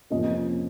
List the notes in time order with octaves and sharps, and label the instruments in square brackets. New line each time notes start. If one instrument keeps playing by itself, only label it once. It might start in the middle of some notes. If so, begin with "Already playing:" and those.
[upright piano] F2 C3 F3 A#3 C#4 D#5